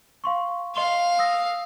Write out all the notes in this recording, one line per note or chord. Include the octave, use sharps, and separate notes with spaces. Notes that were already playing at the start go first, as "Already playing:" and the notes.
F5 C6 C#6
D#5 F5 C6 G7
D#6 E6 A#6